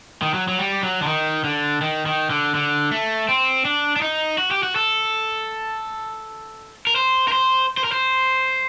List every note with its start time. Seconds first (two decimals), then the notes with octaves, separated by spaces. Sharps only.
0.22 D#3
0.34 F#3
0.48 F#3
0.59 G3
0.83 F#3
1.02 D3
1.07 D#3
1.44 D3
1.81 D#3
2.06 D#3
2.30 D3
2.55 D3
2.92 A3
3.29 C4
3.65 D4
3.96 D4
4.02 D#4
4.38 F#4
4.51 G4
4.63 F#4
4.76 A4
6.87 A#4
6.96 C5
7.28 A#4
7.32 C5
7.77 C5
7.84 A#4
7.92 C5